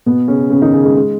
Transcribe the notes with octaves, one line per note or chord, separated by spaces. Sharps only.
B2 B3
C#3 C#4
C#3 C#4
D#3 D#4
C#3 C#4
G#3
G#3